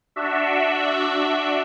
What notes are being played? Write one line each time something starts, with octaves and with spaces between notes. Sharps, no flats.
D4 F#4 E5